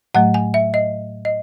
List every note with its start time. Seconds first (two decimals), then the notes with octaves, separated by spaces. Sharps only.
0.14 A2 F#3 A3 F#5
0.34 G#5
0.54 E5
0.74 D#5
1.25 D#5